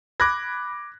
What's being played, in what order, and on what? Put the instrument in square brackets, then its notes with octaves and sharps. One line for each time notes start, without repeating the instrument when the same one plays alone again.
[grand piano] B5 A#6 [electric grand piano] D6 F#6 G#6